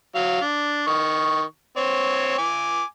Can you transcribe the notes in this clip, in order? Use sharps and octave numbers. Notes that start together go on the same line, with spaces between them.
F#3 F5
D4
D#3 C#6
C4 C#5
G#5 D6